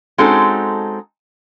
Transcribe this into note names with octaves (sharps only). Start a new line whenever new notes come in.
G#3 C4 C#4 D#4 F#4 A4